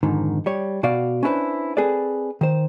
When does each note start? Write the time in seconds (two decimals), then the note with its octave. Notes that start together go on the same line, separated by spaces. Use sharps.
0.03 F2 G#2 D3 D#3
0.46 G3 C#5
0.83 B2 F#4 D5 F5
1.23 C#4 D4 E4 F#4 B4 C5
1.77 C4 G#4 A4 B4 D5
2.41 D#3 C5